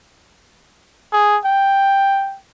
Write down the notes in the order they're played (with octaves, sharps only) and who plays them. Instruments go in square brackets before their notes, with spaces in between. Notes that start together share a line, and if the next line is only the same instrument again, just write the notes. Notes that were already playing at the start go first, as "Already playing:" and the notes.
[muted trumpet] G#4
G5